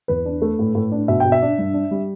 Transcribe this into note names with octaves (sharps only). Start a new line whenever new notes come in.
E2 B4
D4
A3
A2
A2
D4
B2 E5
B2 G5
E5
D4
G2
D4
G3